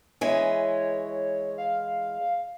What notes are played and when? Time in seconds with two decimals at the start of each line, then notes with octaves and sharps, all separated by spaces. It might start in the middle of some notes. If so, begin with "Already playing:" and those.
0.21 E3 G#3 C#5
1.58 F5